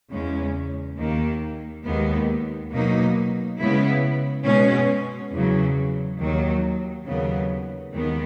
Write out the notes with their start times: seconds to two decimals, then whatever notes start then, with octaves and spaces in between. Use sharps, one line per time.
0.11 E2 C#3 G#3 C#4
0.98 D#2 D#3 A#3
1.85 D#2 D#3 G#3 B3
2.71 B2 F#3 A#3 D#4
3.58 C#3 G#3 B3 E4
4.45 B2 G#3 C#4
5.31 E2 C#3 F#3
6.19 D#2 D#3 F#3
7.05 D#2 C#3 F#3 B3
7.92 D#2 D#3 G#3 B3